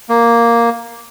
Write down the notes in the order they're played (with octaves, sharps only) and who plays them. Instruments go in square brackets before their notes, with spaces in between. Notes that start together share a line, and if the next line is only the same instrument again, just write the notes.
[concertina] A#3